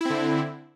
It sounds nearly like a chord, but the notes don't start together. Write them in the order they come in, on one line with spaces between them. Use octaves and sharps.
E4 C4 D3